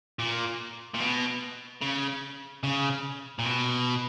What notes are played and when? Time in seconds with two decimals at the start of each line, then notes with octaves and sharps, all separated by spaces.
0.19 A#2
0.95 A#2
1.00 B2
1.82 C#3
2.63 C#3
3.39 A#2
3.45 B2